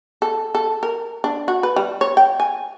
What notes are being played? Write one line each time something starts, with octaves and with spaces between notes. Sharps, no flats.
A4
A4
A#4
D4
F#4
B4
G3
C#5
G5
G#5